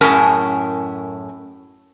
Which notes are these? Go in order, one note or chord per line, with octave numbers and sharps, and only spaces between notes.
F#2 A2 C#4 G#4 A#4 A5